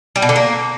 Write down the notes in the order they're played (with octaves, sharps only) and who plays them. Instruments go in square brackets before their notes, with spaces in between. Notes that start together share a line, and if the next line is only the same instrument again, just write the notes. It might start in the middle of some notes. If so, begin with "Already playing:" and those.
[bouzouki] G3
B2
D3
A#3